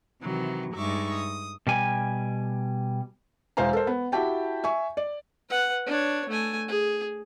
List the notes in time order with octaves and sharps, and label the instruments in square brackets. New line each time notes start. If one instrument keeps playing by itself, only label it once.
[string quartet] C3 D#3 E3 F#3
G2 G#3 D#4 E5 C#6 D6
D#6
[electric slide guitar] B2 G3 G#5
[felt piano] E1 E4 C5 F5 G#5 A#5
A4 A#4 C5
B3
E4 F#4 G4 G5 A5
E5 G#5 C#6
D5
[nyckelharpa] B4 F#5
D4 C#5
A3 G#5
G#4